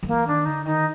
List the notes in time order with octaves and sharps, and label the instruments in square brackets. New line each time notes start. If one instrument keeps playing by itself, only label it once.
[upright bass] F3
[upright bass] E3 [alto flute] A#3
[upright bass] D#3 [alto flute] D4
[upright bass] D3 [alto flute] D#4
[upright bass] D#3 [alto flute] D#4